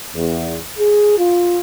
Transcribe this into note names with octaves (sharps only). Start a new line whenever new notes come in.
E2
G#4
F4